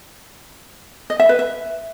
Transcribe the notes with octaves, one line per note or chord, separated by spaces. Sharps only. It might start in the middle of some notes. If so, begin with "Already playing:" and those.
D#5
E5
B4
E5